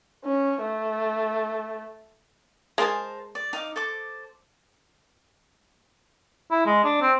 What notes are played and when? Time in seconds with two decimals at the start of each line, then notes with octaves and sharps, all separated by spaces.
0.25 C#4
0.62 A3
2.78 G#3 G#4 A#4 C5 A5
3.35 D5
3.53 D#4 F5 D6
3.76 A4 C5 D6
6.51 E4
6.66 G#3
6.84 D4
7.01 C4